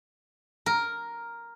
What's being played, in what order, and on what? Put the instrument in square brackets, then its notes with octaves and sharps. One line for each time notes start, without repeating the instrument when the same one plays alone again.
[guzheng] A#4